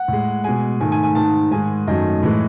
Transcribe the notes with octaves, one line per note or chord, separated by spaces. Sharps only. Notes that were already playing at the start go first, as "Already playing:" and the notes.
Already playing: F#5
A2 G#3
B2 G#3 G#5
G#2 D#3 A3 G#5
G#5
G#5
G#2 D#3 G#3 A5
G#2 D#3 G#3 G#5
F#2 D#3 F#3 A3 D#5
A2 E3 G#3